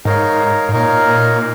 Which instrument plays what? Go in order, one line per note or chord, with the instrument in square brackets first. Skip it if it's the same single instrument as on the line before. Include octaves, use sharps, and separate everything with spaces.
[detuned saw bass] G#2 [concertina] D#4 A#4 C#5 F5
[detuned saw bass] G#2
[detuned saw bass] A#2 [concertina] D#4 A#4 C#5 F5